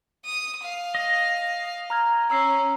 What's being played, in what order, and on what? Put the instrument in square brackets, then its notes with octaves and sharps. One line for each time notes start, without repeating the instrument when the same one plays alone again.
[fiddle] D#6
F5
[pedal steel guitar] D#5
[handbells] A#5 F6 G#6
[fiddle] C#4 [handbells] A#5 E6 C7